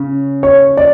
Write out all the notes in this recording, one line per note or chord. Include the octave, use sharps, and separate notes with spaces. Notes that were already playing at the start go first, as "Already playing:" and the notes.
Already playing: C#3
C#5
D5